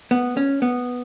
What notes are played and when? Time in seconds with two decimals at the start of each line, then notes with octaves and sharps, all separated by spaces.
0.11 B3
0.37 C#4
0.62 B3